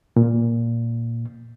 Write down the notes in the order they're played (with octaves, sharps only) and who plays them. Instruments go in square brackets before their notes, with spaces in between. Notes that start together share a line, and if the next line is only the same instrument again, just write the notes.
[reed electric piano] A#2